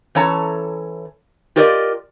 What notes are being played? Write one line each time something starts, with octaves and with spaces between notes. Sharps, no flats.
E3 C#4 A4 C#5 A5 A#5
F4 G4 A#4 C5 D5 D#5